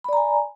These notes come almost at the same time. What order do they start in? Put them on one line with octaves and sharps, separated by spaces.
B5 D5 A#5 G#5